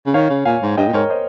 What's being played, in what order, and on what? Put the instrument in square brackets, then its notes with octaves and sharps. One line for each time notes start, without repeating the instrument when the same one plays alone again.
[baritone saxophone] C#3
[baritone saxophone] D#3 [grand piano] C#5 F5
[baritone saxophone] C#3
[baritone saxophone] A#2 [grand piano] F5 G#5
[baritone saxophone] G#2
[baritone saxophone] G2 [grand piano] D#5 G5
[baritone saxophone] A#2
[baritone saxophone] G#2 [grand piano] A#4 C#5
[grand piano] C5 D#5